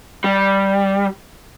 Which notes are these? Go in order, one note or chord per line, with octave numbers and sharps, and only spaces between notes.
G3